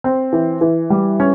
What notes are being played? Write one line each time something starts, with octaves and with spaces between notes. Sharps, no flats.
C4
E3
E3
G3
C#4